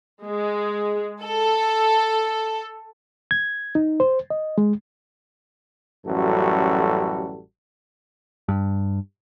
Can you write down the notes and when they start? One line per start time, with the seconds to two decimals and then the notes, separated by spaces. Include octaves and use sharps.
0.25 G#3
1.22 A4
3.31 G#6
3.75 D#4
4.00 C5
4.30 D#5
4.58 G#3
6.06 A1 F#2 G3 F#4 A4
8.48 G2